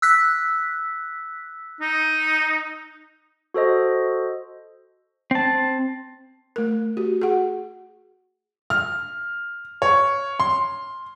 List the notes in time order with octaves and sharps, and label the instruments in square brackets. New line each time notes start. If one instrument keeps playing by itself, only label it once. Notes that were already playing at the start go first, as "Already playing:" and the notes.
[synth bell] E6 F#6 B6
[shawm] D#4
[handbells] F#4 A4 C5 D#5
[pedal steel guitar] C4 A5
[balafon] A3 A#4
[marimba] F#4 [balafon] G4
[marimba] F#4 [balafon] G#4 F#5
[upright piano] F6
C#5
C6